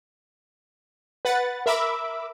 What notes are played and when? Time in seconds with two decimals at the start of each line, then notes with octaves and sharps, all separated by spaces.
1.25 B4 F#5 A6
1.66 A#4 E5 B5 D6 E6